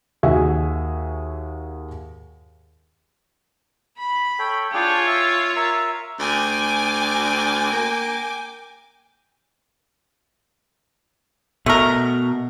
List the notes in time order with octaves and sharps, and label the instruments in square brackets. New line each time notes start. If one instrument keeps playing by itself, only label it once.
[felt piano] D#2 F#4 G#4 E5
[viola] B5
[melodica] A4 C#5 G5
[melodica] D4 G#4 G5 [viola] F4 C#5
[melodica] E5
A#4 E5
[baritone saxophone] D2 [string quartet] G5 G#5 D6
[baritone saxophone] A#3
[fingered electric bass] B2 [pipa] A3 A#4